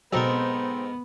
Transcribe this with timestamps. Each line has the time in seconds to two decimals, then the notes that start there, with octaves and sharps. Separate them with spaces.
0.13 G#2 B2 F#3 B3 C4 D#4 A4 A#4